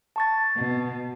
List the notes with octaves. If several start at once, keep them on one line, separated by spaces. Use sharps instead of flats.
A5 C#6 A6
B2